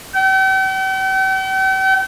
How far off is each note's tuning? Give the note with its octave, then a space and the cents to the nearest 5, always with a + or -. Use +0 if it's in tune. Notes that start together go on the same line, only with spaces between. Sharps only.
G5 -45